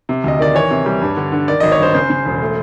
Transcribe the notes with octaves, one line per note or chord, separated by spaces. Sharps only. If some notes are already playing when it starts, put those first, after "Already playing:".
C3
D2 D#5
D#3 D5
E3 C#5
C3
G3
G2
D3
D3
D#3 D5
G#1 D#5
C#5
G2 C5
C#3 C5
C#3
E1
A3